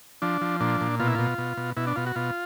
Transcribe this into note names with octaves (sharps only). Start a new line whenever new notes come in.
F3 D4
F3
A#2 D4
A#2
B2 F4
E4
B2 F4
B2
B2
B2 E4
D4
B2 F4
F#4
B2 F4